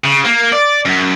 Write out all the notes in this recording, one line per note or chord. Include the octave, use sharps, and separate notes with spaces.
C#3
A#3
D5
F#2